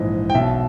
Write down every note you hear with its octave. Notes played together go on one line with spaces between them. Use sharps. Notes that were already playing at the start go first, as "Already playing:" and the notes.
Already playing: A#1 G#2 E3 D#5
G5
B1 B2 E5